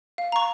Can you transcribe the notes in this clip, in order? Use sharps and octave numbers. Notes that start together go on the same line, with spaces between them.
F5
A#5 C#6